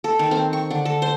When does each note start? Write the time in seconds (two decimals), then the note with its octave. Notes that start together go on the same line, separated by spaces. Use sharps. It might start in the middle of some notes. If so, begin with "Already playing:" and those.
0.04 A4
0.19 D#3
0.31 C4
0.53 C#6
0.71 D3
0.85 A4
1.02 C5